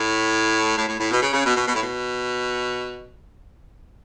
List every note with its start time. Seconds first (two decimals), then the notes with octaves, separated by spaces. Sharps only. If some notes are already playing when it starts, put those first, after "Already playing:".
Already playing: A2
0.76 A2
0.87 A2
0.98 A2
1.10 B2
1.22 C#3
1.33 C#3
1.44 B2
1.56 B2
1.67 B2
1.74 A2
1.81 B2